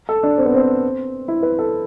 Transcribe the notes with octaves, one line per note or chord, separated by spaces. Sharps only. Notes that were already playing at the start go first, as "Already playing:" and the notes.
A4
D4
C4
B3
C4
E4
B4
A4